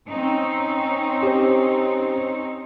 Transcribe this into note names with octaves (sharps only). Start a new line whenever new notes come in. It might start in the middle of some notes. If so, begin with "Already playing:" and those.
C4 C#4 D#4
G4 C5